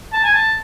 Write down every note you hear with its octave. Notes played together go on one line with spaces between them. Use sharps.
A5
G#5
A5